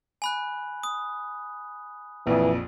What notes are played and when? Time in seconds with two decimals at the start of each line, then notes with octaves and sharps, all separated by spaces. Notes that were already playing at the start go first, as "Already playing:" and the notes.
0.22 G#5 B5 F#6
0.83 D#6
2.27 A#1 F2 E3